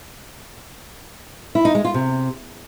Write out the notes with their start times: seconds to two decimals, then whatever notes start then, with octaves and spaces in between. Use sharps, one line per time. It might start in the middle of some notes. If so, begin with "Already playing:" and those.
1.55 E4
1.65 D#4
1.75 G#3
1.85 F4
1.94 C3